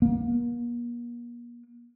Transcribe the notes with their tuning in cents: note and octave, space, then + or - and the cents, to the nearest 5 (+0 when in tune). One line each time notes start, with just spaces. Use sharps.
A#3 +40